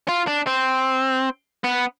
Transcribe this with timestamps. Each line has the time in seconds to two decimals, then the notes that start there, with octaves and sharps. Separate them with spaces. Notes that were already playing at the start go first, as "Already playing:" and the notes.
0.08 F4
0.27 D4
0.47 C4
1.64 B3